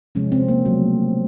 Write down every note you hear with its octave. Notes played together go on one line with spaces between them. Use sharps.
C3 F3 G#3 C#4
C4
A#3
C#3 F#3 A3